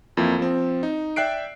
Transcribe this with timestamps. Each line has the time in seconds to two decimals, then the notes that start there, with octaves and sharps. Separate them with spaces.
0.17 F2 E3 A#3 E4
0.39 F3 C4
0.83 D#4
1.16 D5 E5 G5 F#6 C7 D7